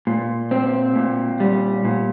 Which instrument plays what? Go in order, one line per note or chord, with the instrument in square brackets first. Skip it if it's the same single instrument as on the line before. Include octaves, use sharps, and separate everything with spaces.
[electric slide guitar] A#2
C4
A#2
G3
A#2